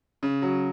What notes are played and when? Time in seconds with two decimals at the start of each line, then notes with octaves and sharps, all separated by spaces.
0.23 C#3
0.42 F#3